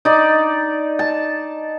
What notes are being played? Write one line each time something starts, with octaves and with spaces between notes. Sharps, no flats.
D#4 D5
A5